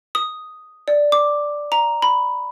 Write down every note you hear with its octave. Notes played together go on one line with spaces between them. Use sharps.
D#6
D5
D6
A#5
B5